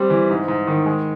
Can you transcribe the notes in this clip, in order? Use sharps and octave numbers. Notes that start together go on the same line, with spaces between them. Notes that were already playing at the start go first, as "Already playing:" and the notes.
Already playing: G3 C4
E3
G#2
G#2
D#3
G#3